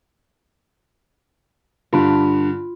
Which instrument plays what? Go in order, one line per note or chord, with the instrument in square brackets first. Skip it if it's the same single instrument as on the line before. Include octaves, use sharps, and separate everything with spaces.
[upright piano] G2 D3 [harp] F4 B5 D7